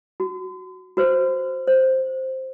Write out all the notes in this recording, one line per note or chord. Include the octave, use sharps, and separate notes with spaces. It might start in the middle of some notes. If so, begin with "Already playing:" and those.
F#4
F#4 B4 C5
C5